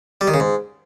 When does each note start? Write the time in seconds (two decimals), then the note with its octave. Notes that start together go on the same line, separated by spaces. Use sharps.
0.21 G3
0.27 D#3
0.34 C#3
0.40 G#2